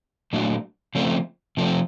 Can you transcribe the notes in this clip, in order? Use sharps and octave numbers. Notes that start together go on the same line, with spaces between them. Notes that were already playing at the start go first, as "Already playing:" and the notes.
A#2 F#3 A3 D4 F#4
C#3 F3 A3 C4
C3 F3 A3 C4